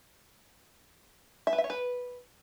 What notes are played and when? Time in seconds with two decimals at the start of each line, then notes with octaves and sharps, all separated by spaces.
1.47 E5
1.53 B4
1.58 E5
1.64 C#5
1.70 B4